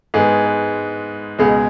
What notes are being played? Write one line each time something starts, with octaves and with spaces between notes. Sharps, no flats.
G#2 G#3 B3 G#4
B4
C#2 B2 G#3 G#4